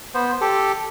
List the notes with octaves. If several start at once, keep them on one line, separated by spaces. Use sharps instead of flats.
B3 C5
G4 A4